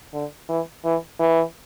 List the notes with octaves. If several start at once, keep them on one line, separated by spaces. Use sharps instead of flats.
D3
E3
E3
E3